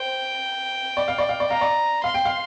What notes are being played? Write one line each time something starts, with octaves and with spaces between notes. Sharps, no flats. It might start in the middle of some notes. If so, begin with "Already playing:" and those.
Already playing: C5 G5
D5
F5
D5
F5
D5
F5 A#5
D5
F5 C6
G5
F5